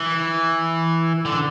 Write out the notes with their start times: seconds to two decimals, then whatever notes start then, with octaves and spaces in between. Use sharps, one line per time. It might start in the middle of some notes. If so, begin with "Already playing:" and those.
Already playing: E3
1.25 D3